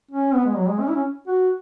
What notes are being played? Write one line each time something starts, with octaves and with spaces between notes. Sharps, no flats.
C#4
B3
G#3
F#3
G#3
C#4
E4
C#4
F#4